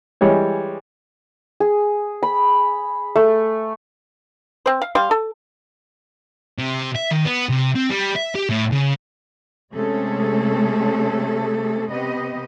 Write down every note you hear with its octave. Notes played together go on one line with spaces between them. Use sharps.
E3 G3 G#3 C#5
G#4
B5
A3
C4 C5
F5
G3 F5 C6
A4
C3
E5
D#3
B3
C3
C4
G3
E5
G4
A2
C#3
C3 G#3 A3 C#4 G#4 A4
C3 B3 G4 D#5